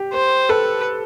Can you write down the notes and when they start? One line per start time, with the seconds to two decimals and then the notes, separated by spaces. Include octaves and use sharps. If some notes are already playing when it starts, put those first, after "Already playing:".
Already playing: G4
0.13 C5
0.49 A4 B4